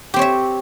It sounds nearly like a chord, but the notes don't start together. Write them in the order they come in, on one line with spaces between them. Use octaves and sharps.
G4 C4 C#5 E5